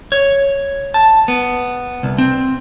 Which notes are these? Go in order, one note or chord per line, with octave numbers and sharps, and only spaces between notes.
C#5
A5
B3
C2
C4